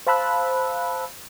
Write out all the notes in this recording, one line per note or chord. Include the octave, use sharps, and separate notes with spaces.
C5 F5 A5 B5 E6 F#6